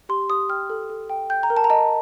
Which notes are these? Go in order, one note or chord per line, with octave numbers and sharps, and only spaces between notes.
G4 C6
G4 D#6
G5 F6
A4
A4
G5
G5 G6
A#5
A#4
A5
A#5
D#5 A5